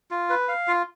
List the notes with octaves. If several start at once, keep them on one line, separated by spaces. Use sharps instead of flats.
F4
B4
F5
F4